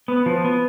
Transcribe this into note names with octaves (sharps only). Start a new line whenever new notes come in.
B3
F3
B3